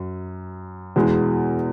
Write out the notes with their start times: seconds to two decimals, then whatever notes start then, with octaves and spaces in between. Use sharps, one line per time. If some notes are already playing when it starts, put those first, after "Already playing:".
Already playing: F#2
0.96 E2 B2 G#3